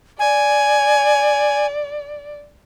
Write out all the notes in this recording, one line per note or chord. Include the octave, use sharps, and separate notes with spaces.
D5 G#5